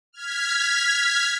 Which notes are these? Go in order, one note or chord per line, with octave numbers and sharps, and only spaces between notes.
F6 G#6 B6